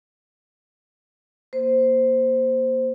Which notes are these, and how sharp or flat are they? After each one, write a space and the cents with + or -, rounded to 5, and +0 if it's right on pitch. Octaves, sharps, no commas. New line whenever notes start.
A#3 +15 C5 -5